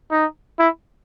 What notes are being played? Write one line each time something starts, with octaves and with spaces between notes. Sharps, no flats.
D#4
E4